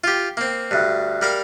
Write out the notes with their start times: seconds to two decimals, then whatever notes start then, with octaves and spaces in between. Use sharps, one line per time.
0.04 F4 G4
0.37 A#3 C4
0.71 D2 G2
1.22 G3 A#4 F5